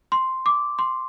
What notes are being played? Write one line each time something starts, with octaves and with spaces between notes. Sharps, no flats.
C6
D6
C6